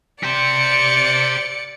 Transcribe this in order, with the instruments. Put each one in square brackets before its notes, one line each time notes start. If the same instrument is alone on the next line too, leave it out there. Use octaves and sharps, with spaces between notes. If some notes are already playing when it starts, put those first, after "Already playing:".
[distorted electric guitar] G4 C5 [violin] D5 C#7